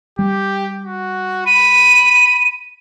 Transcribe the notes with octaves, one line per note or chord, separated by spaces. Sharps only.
G3 G4
F#4
B5 D#7